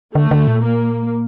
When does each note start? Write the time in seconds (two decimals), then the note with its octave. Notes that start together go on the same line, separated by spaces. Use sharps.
0.15 D3 A3
0.31 D3
0.48 A#2
0.64 A#3